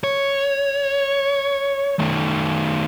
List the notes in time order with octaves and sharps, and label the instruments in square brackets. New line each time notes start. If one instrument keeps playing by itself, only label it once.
[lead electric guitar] C#5
D#3 A3